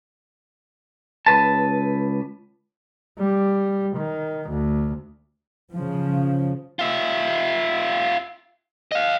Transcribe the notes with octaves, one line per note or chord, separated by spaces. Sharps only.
C#2 B4 A5
G3
D#3
D2
C#3 F3
F4 E5
D#5 F5